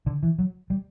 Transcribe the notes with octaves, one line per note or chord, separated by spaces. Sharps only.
D3
E3
F#3
G3